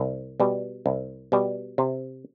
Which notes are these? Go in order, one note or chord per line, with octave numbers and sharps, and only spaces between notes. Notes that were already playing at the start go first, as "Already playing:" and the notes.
Already playing: C2
B2 G3
C2
B2 G3
C3